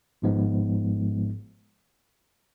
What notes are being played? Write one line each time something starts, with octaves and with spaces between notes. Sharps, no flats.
G#1 G#2 F3 G#3 B3